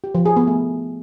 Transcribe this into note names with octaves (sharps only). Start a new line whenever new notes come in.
G4
F3
G#4
B3
A3